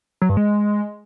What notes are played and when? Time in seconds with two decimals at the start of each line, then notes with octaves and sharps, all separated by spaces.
0.22 F#3
0.29 G2
0.37 G#3